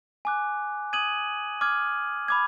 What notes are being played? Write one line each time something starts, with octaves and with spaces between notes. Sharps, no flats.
G#5 D6 F#6
D#6 G#6 D#7 F#7
D6 F6 G#6
B5 D6 G#6